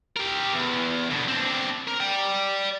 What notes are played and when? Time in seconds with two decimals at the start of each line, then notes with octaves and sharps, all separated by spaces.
0.17 G4 A#4
0.54 E2
1.10 D2 B2
1.28 C4 D4
1.87 A#4
2.00 D5 G5